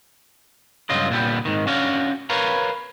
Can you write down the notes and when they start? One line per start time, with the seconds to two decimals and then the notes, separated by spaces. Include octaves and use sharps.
0.90 C#2 G2 F#3 F4 D#5
1.10 A#2 D3 G3 B3
1.45 G#2 D#3
1.67 C#4 D4 F#4 F5
2.30 A#4 B4 C#5 F5 A#5